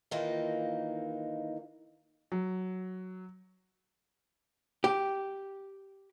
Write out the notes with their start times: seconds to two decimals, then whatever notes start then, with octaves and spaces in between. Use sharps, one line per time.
0.11 D#3 E3 A#3 D#4 F4
2.32 F#3
4.84 G4